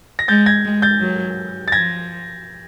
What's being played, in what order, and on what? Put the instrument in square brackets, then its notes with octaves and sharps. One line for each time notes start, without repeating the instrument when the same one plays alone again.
[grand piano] A#6
[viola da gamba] G#3 [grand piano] G6 A6
[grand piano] G#6 A#6
[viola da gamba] G#3
[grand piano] G6 A6
[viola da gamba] F#3
[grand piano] A6
[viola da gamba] F3 [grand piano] G#6 A#6